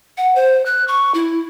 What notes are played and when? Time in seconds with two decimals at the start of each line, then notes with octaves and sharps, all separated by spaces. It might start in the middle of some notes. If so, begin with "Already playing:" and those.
0.17 F#5
0.35 C5
0.66 F#6
0.88 C#6
1.14 E4